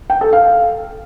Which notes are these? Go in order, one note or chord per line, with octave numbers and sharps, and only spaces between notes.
G5
A4
F5